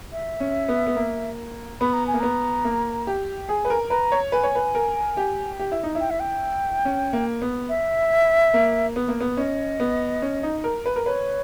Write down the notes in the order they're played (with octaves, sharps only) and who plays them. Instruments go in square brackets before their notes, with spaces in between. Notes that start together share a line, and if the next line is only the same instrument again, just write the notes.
[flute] E5
[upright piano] C#4
B3
B3
A#3
[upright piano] B3 [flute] B5
[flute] A#5
G#5
[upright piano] A#3
[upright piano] B3 [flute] A#5
[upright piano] A#3
G4
[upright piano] G#4 [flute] G#5
[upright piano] B4
A#4
[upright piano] B4 [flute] A#5
[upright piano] C#5
[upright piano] B4 [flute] G#5
[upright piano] C#5
B4
A#4
G4
G4
E4
D#4
E4
[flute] G5
E5
G5
[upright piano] C#4
A#3
B3
[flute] E5
[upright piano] A#3
B3
A#3
B3
[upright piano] C#4 [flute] D#5
[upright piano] B3
C#4
D#4
A#4
B4
A#4
[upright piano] B4 [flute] C#5